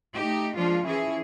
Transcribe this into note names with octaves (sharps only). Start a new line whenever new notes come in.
A3 D#4 G4
F3 G#3 A#3 D4 F4
E3 F3 C#4 E4 G#4